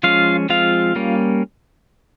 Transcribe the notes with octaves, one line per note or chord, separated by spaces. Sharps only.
F3 G#3 C#4 F4 F5
F3 G#3 C4 F4 F5
G3 A#3 C#4